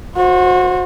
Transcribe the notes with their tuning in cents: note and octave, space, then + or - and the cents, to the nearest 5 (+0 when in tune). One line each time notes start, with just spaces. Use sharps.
F#4 -25 C5 +15